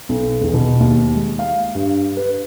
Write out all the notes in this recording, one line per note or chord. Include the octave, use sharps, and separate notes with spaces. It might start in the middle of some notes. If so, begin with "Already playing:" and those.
B1
E2
B2
D#2
G#3
F5
G2
B4